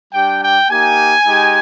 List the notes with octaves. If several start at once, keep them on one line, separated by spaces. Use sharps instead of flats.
G3 D4 G4 G5
G5
A#3 D#4 G4 G#5
G#3 D#4 G4